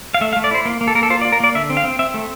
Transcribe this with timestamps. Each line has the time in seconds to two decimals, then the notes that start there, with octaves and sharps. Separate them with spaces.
0.14 F5
0.21 A3 E5
0.33 F5
0.36 A3
0.44 D5
0.51 E4 C5
0.65 A#3
0.81 A#3
0.88 A4
0.95 A#3 A#4
1.03 A4
1.10 F4 C5
1.21 D5
1.25 F4
1.32 A#4
1.40 A#3 D5
1.55 D3 E5
1.70 C4
1.77 F5
1.84 C4
1.99 C4 E5
2.14 A3